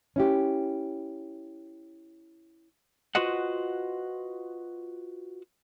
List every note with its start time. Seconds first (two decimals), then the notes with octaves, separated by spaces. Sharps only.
0.16 C#4 E4 G4
3.15 F4 F#4 B4 C5 D#5 F#5